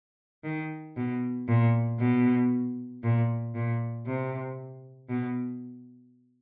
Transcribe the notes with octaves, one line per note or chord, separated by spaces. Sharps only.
D#3
B2
A#2
B2
A#2
A#2
C3
B2